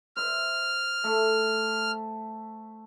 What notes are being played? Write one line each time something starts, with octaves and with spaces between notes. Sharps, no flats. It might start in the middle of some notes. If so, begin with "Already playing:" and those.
C5 E5 F6
A3 E5